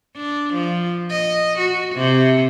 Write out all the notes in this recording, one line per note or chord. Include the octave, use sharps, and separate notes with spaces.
D4
F3
D#5
F#4
C3